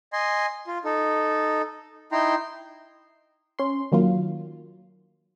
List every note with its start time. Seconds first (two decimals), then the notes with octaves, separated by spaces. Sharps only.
0.13 D#5 G#5 C6
0.67 F4
0.85 D#4 A4
2.12 D#4 E4 G5 A#5 C6
3.59 C#4 C6
3.92 D#3 F#3 A#3 F4